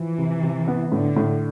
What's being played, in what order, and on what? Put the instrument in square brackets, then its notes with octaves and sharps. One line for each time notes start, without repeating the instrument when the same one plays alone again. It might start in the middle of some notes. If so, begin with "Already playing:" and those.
Already playing: [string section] E3 [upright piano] F3
[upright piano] C3
C3
B3
[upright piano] A2 [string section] D3
[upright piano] A2